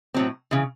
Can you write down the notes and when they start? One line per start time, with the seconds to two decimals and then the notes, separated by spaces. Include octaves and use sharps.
0.14 A2 F#3 C4
0.51 C#3 E3